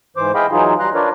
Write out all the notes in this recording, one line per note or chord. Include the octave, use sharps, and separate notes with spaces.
G#2 E3 C5 D6
E4 G#4 D#5 F5 G5 B5
E3 F#3 D#4 F4 G#4
G3 A#5 C6 F#6
D4 F4 A#4 B4 C#5 D5